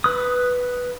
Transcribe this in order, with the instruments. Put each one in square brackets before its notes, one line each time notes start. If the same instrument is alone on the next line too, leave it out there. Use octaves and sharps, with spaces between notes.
[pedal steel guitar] B4 D#6